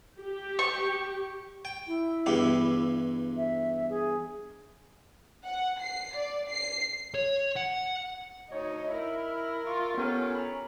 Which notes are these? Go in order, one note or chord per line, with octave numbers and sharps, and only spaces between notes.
G4
C#6
G5
E4
E2 G2 G4
E5
G#4
F#5
C7
D5
C7
C#5
F#5
D2 D#4 C#5
E4 A#4
F4 C#6
B3 C#4 F4 G4 A4 A#4 G5
A#5 B5